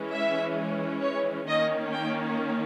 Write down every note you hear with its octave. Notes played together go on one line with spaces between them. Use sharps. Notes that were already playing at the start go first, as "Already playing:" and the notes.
Already playing: E3 G#3 C#4
E5
C#5
D#3 A#3 C#4 D#5
G5